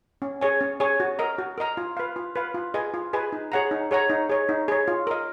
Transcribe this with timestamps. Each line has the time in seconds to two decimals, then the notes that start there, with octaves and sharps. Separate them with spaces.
0.22 C#4
0.41 G#4 C#5 G#5
0.61 C#4
0.80 G#4 C#5 G#5
1.00 F#4
1.19 A#4 D#5 A#5
1.39 F#4
1.58 A#4 D#5 A#5
1.77 F4
1.97 B4 F5
2.16 F4
2.36 B4 F5
2.55 F4
2.74 G#4 B4 D#5 G#5
2.94 F4
3.13 G#4 B4 D#5 G#5
3.33 D#4
3.52 G#4 C#5 F#5 A#5
3.71 D#4
3.91 G#4 C#5 F#5 A#5
4.10 D#4
4.30 G#4 C#5
4.49 D#4
4.68 G#4 C#5
4.88 F4
5.07 A#4 D#5